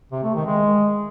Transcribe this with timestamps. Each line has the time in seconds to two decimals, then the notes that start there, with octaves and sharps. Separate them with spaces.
0.12 C3
0.23 A3
0.35 D#3
0.47 G#3